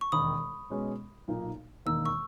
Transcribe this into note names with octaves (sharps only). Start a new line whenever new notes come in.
C#6
E1 D#2 D#3 B5 D#6
B2 G#3 C#4
B1 A#2 A#3 D#4 A#4
E1 D#2 D#3 A#3 D#4 E6
C#6 E6